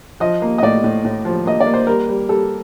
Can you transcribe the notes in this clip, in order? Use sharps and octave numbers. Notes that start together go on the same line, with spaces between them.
F3 D#5
A#3
D#5
A2 D5
A2
A2
F3
A#3 D#5
D5
A#3
C5
G3 A#4
G3
G3 A4